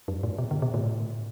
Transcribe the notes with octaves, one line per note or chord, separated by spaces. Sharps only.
F#2
A2
B2
D3
B2
A2